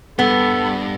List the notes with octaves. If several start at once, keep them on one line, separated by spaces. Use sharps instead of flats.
G2 B3 A4